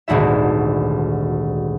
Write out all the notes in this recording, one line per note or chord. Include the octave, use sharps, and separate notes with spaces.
D#1 G#1 D2 F#4 E5